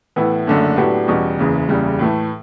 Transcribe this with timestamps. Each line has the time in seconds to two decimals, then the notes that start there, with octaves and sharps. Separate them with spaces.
0.16 A2 E3 B3 E4
0.47 F#1 F#2 D3 A3 D4
0.77 A2 F#3 B3 D4 G4
1.07 E2 B2 G3 C#4 F#4
1.38 F#1 E2 C#3 E3
1.69 F#1 E2 C#3 G3
1.99 A2 E3 A3